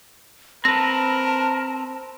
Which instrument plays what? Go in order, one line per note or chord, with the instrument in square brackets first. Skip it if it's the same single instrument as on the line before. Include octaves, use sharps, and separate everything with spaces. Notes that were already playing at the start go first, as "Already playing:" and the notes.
[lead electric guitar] C4 B4 [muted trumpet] A#4 [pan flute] A5 [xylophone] A#6